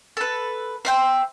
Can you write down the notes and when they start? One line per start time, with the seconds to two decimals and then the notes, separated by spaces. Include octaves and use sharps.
0.17 A4 B4
0.85 C5 E5 G5